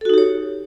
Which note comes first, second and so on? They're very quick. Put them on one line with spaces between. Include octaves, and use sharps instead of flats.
A4 F#4 D#4 G4 C#5